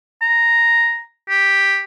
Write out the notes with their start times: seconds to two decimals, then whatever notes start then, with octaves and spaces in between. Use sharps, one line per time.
0.22 A#5
1.29 G4